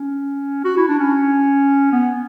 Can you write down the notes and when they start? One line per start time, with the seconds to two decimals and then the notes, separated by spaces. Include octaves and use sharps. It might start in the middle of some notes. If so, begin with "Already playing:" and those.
Already playing: C#4
0.65 F#4
0.77 E4
0.88 D4
0.99 C#4
1.92 B3